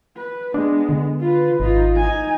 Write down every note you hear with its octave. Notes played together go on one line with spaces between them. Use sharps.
B4
G#3 B3 D4
D3
F4 B4
G#1 D#4 F4
D#4 G#5